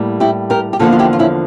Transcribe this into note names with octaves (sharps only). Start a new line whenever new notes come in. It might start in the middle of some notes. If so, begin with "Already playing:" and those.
Already playing: A2 G3 A#3
E4 G4
G4 A#4
G4
E2 D3 F3 A#3 F4 A4
F4
E4 G4
F4
C#4 E4